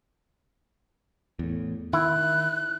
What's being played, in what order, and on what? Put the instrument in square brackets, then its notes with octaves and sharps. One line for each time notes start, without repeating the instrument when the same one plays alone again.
[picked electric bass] E2 A2
[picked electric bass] D#3 [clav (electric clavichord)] E4 [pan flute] F#6